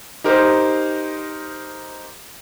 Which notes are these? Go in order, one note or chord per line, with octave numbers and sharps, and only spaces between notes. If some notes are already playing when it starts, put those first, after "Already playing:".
D#4 G4 A#4 C5